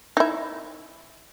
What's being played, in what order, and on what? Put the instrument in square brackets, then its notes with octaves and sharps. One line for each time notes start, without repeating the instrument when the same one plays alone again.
[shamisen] D#4 E4